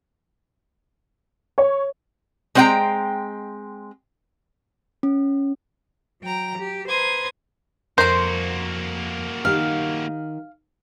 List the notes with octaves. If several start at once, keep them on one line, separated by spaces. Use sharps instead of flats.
C#5
G#3 C4 C5 F#5 G5 A#5
C#4
F#3 G5 A#5
G4
B4 C5 A#5 C6 D#6 G#6
F2 A#3 F#4 A#4 C5 C6
D#3 G4 F5